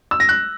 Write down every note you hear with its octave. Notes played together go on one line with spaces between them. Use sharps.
E6
A#6
F#6